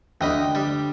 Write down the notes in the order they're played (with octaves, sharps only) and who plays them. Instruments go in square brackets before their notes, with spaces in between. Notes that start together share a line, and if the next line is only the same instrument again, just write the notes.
[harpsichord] D2 D#5 B5 [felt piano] D3 G5
[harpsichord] G3